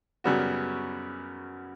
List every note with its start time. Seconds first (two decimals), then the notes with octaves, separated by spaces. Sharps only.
0.24 F#2 C#3 G3 B3 F#4